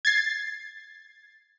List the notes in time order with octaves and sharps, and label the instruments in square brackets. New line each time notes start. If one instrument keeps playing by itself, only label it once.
[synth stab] G#6 A6 C7